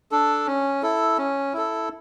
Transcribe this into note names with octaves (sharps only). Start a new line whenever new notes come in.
D4 A4
C#4
E4 A4
C#4
E4 A4